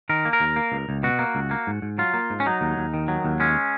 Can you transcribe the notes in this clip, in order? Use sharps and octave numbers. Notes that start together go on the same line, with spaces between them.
D#3 A#4
A#3
A#4
D#2
A#3
C#2
C#2
B2 F#4
A#3
C#2
A#3
G#2
G#2
F#3 F4
A#3
G#2
C#4
F#3 D#4
D#2
D#2
D#3
F#3
D#2
G#3 C#4